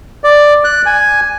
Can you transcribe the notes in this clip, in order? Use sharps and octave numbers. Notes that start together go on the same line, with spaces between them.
D5
F#6
G#5